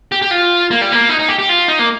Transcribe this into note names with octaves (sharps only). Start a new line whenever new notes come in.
G4
G4
F4
A#3
G3
A#3
D#4
D#4
G4
G4
F4
D#4
A#3